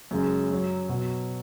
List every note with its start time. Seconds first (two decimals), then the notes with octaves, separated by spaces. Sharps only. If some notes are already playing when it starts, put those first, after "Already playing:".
0.11 F#2 C#3 G#3
0.50 F#2 F#3
0.89 B2 F#3